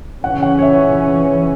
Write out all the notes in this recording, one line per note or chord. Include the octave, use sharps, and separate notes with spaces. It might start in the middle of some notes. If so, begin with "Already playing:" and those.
C#3 E3 C#4 F#5
F#5
C#5
E5